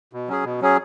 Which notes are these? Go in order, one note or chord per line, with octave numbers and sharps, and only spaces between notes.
B2
F#3 C#4 G#4
B2
F#3 C#4 G#4